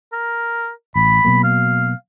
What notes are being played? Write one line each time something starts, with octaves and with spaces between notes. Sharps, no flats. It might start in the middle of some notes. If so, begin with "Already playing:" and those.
A#4
A1 B5
B2 F#3 A#3
F5